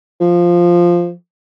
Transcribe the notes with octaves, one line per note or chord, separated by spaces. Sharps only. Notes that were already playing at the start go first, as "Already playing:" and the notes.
F3